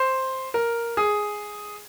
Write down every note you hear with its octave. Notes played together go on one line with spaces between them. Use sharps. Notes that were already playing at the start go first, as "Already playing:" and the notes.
Already playing: C5
A#4
G#4